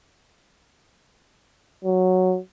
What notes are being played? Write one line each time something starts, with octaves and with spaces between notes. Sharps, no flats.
F#3